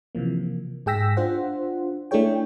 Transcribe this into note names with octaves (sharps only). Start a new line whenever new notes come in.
C3 E3 F3 A#3
G#2 G#4 G5 E6 A#6 B6
D4 F4 C5 F#5
A3 D4 E4 G#4 C#5 G5